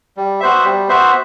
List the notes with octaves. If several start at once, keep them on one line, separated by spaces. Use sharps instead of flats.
G3
B3 F#4 C5 E5
G3
B3 F#4 C5 E5